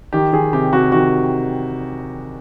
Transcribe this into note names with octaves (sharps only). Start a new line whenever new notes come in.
D#3 G4
D#3 G#4
C3 G4
C3 F#4
D#3 F#4